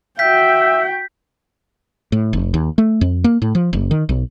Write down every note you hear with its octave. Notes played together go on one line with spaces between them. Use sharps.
F#4 E5 G5 G6 B6
A2
F1
D#2
A3
F2
A#3
A2
F3
F#1
D#3
B1